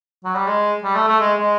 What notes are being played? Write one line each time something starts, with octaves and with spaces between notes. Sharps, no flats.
F#3
G3
G#3
G3
A3
A3
G#3
G#3